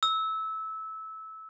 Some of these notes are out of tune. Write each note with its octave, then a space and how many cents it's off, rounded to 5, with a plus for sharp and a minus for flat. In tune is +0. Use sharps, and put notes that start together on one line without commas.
E6 -20